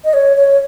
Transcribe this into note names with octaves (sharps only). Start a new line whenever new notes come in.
D#5
C#5
C#5